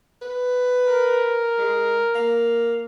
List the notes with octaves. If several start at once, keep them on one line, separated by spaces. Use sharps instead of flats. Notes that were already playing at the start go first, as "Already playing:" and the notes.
B4
A#4
G#3
A#3